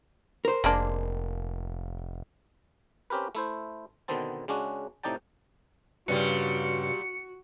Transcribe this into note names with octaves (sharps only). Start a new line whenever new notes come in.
A#4 C5
F1 G#3 A#3 D4
C4 C#4 G4 A#4 B4
A3 E4 C5
B2 D3 D#3 B3 C4 A5
C#3 G#3 C#4 D4 F#4
A2 C3 D#4 D5 G5 A5
G2 A#2 C#3 G3 F#4 C#7